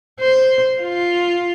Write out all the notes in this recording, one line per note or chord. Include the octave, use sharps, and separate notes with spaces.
C5
F4